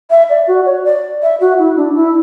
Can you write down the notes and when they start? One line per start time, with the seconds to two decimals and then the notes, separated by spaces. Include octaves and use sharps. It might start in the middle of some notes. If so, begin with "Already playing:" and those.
0.10 E5
0.30 D5
0.47 F#4
0.66 C#5
0.85 D5
1.22 E5
1.40 F#4
1.59 E4
1.77 D4
1.95 E4